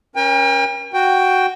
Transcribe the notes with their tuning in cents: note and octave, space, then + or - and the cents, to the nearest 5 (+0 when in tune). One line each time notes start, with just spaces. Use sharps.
C#4 +0 A#4 +35 G5 +40
F#4 +5 G5 +0